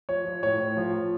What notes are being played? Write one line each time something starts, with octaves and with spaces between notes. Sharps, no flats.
F3 C#5
F3
A2 C#5
A2
F3
F3